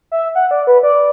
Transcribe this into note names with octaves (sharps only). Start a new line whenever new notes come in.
E5
F#5
D5
B4
D5